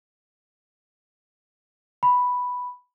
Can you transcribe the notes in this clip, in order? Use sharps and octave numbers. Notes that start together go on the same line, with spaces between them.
B5